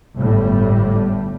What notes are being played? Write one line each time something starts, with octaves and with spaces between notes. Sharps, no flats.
G1 A2 G3